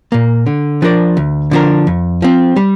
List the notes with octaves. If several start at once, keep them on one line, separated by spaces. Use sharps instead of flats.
A#2 A#3
D3
F3 D4 A#4 D5
D2
D3 F3 D4 A#4
F2
F3 C4
G3